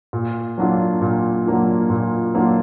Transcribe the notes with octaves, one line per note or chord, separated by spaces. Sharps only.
A#2
F#3 A#3 D4 F4
A#2
F#3 A#3 D4 F4
A#2
F#3 A#3 D4 F4